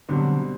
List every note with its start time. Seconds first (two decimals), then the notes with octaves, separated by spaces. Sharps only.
0.08 B2 D3 F#3 G3 C4